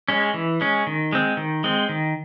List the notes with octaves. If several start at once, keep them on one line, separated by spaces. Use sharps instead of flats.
G#3 C#4
E3
G#3 C#4
D#3
G#3 C4
D#3
G#3 C4
D#3